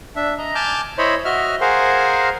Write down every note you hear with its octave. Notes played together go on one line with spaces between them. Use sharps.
D4 E5
D#5 A#5
G#5 A5 D6 F6 G6
E4 C5 C#5 D#5 B5
F#4 D#5 E5 F6
G#4 A#4 C5 F5 F#5 G#5